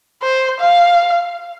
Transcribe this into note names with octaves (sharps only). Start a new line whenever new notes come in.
C5
F5